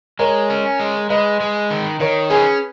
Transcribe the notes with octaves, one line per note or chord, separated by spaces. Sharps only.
G#3 A#4 C#5
C#4
G#3
G#3 B4 D#5
G#3
D#3
D#3 A#4 C#5
C#4 G#4 B4